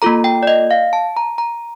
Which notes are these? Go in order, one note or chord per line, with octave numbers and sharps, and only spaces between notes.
A#3 F4 A4 A#5
G5
D5
D#5
F5
A5
A#5
A#5